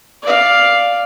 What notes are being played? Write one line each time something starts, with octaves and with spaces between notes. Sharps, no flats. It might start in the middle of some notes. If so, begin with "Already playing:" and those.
D5 F5